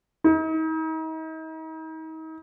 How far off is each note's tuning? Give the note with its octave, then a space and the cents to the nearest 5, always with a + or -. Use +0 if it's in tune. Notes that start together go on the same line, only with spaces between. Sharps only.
D#4 +40